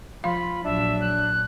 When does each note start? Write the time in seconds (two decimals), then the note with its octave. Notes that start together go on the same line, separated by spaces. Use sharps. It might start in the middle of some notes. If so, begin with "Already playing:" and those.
0.24 F3 F4 F5 B5
0.64 A#1 F#3 D4 E5
1.01 F#6